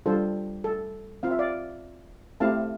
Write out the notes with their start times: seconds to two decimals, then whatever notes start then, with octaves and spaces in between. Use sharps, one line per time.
0.06 G3 D4 F4 A4 C5
0.64 A4
1.23 C4 F4 F5
1.31 E5
1.39 D5 F5
2.40 A3 C4 E4 G4 F5 A5